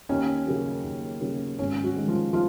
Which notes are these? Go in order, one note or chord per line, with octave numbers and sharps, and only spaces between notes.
D#2 C#4 C#5
C#3 F#3 A#3
D#2
C#3 F#3 A#3
G#1 C#4 C#5
F#3 F#4
G#2 D#3 G#3
F3 F4
F3 F4